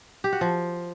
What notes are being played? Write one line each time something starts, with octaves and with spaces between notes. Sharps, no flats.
G4
F#4
F3